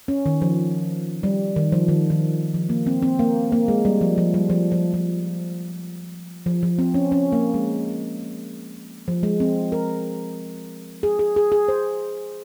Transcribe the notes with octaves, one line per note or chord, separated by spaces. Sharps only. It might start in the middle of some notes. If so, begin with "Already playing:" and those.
C#4
D#3
F3
G3
D#3
F3
D#3
D#3
F3
A#3
C4
C4
A#3
A#3
G#3
G3
F3
F3
G3
F3
F3
F3
F3
F3
C4
C#4
C#4
A#3
G#3
F3
G#3
C4
A#4
G#4
G#4
G#4
G#4
C5